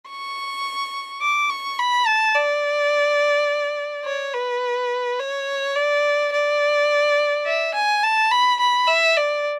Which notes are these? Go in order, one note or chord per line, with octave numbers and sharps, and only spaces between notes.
C#6
D6
C#6
B5
A5
D5
C#5
B4
C#5
D5
D5
E5
G#5
A5
B5
B5
E5
D5